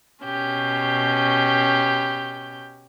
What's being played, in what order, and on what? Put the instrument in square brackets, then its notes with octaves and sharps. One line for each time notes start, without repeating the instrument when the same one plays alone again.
[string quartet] B2 C#4 G4 G6